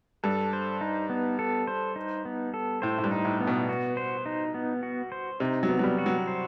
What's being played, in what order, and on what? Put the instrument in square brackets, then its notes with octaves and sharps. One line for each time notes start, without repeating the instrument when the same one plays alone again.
[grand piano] G2 [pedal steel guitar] A4
[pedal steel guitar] C5
D#4
B3
A4
C5
D#4
B3
A4
[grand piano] A2 [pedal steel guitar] C5
[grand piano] A2
G2
[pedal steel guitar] D#4
[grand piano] A2
[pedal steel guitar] B3
[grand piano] B2
[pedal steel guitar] F#4
C5
D#4
B3
F#4
C5
[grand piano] C3 [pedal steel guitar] D#4
[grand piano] F#3
[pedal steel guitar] B3
[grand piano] F#3
G3
[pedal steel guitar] F#4
[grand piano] F#3
[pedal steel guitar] C5